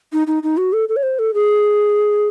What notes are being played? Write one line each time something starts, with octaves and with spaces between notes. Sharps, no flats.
D#4
D#4
D#4
F#4
A4
A4
C#5
C5
A4
G#4